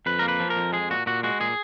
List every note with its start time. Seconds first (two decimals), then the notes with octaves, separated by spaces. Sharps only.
0.06 F2 B4
0.19 A#3 A#4
0.28 B4
0.40 F3
0.50 A#4
0.56 F2
0.72 G#3 G#4
0.90 A#2 F#4
1.06 A#2 F#4
1.23 G#3 F#4
1.40 A#2 G#4